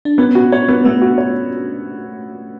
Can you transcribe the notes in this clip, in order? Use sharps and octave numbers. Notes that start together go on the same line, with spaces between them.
D4
B3 C#4
F#4
C#4 C#5
B3
A3 B3
F#4
C#5